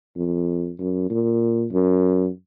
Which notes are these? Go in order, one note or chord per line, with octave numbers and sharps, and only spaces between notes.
F2
F#2
A#2
F#2